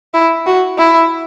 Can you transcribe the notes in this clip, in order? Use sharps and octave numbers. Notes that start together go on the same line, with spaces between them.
E4
F#4
E4